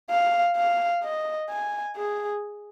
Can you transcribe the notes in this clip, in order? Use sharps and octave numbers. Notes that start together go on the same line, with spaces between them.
F5
F5
D#5
G#5
G#4